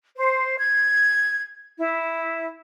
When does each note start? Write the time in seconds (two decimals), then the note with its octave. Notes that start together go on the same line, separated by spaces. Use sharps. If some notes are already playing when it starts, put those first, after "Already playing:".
0.17 C5
0.59 G#6
1.78 E4